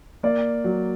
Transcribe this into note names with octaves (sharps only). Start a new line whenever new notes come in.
A#3 D5
F#3